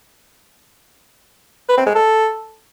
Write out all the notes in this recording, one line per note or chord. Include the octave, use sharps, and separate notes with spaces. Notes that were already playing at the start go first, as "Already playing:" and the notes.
B4
C4
G#3
A4